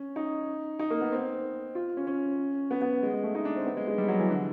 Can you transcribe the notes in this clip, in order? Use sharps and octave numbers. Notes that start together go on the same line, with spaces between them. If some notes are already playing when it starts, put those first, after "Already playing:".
Already playing: C#4
D#4
D#4
A#3
B3
C4
F4
C#4
C#4
B3
B3
G#3
G#3
A3
D#4
D4
C4
B3
G#3
G#3
G3
F#3
E3
D3